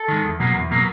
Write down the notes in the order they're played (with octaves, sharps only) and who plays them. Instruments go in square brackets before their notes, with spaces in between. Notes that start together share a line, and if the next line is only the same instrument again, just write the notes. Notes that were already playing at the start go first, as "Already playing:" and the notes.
Already playing: [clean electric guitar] A4
D#3 G#3
E2
B2 F#3 A#3
E2
B2 F#3 A#3